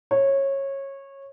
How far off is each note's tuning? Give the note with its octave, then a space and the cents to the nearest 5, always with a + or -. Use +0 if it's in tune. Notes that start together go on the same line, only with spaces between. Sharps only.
C#5 -20